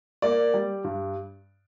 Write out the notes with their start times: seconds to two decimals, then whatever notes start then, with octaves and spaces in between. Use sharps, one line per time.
0.22 A#3 D5
0.54 G3
0.84 G2